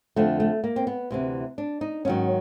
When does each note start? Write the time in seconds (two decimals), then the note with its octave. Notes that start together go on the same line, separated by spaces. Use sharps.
0.16 F2 D3 F3 A3
0.40 A3
0.64 A#3
0.76 C4
0.87 B3
1.11 D2 C3 E3
1.58 D4
1.81 D#4
2.05 G#2 D#3 F#3 C#4